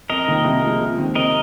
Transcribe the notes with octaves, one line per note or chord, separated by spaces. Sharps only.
F2 A#4 D#5
C3 D#3 A#3
C2
C3 F3 G#3
D#2
D#3 C4
C3 A#4 D#5